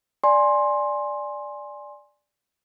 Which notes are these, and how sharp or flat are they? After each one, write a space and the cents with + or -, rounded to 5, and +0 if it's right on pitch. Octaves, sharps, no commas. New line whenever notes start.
D5 +0 G#5 +0 C6 +15